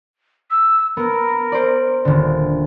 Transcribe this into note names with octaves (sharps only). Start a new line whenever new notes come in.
E6
B3 A#4
C5 D5
D#1 D3